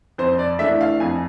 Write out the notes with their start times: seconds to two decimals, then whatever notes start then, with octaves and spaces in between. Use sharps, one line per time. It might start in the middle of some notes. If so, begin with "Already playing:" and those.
0.18 F2 C5
0.39 D5
0.59 E3 A3 D4 E5
0.81 F5
1.00 F2 G#5